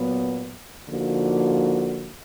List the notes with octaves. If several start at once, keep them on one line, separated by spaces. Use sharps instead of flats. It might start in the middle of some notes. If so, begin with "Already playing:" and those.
Already playing: A#2 F#3 B3
D3 F3 A#3 D#4 F#4